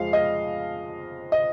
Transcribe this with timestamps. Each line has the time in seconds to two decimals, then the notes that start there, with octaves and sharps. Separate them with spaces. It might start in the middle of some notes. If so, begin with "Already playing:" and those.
Already playing: F2 F3 G#3 F5
0.13 D#5
1.32 D#5